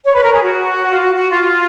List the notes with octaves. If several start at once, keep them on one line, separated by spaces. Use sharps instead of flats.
C#5
B4
A#4
G#4
F#4
F4
F#4
F#4
F4